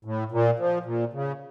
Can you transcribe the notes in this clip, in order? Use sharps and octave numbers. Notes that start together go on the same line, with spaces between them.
A2
A#2
F3
A#2
C#3